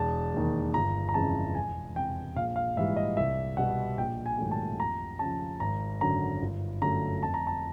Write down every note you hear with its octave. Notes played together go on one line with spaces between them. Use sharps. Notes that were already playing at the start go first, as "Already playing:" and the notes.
Already playing: E1 A5
D#2 D#3
G1 A#5
A#5
F2 C#3 E3 G#3 A5
E1 G#5
E2 C3 E3 G5
A#1 F5
F5
G#2 E3 G3 E5
D#5
C2 E5
B2 G3 F#5
A#1 G5
G#5
G#2 D#3 F#3 A3
A5
F2 A#5
C#3 F3 A5
G#1 A#5
F#2 D3 F#3 A#5
G1
F#2 D3 F#3 A3 A#5
F2 A5
A#5
A5